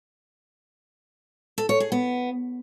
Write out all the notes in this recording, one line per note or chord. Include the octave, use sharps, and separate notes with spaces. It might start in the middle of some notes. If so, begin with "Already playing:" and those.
A4
C#5
G#4
B3